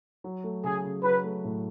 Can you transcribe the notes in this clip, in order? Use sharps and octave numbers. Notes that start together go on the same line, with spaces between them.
F#3
A3
C#3 G#4
C#3
F#3 B4
A3
A2